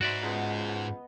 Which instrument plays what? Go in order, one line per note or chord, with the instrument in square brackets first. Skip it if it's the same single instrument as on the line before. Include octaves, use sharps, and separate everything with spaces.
[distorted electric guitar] G#2 [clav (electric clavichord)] F#4 D5 E5 [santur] B4 C5 A#5
[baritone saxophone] C#2 [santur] B3 D#5 F#5